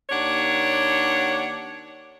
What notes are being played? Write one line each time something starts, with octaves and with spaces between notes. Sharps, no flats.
D#2 D4 C#5 F#5